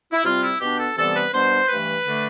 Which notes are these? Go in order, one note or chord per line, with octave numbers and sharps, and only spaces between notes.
E4
C3 G3 C4 F4
E4
B2 B3 D4 G4
A4
C3 E3 G3 B3 D4 A4
B4
B2 G3 B3 D4 C5
G2 E3 A3 B4
D3 A3 D4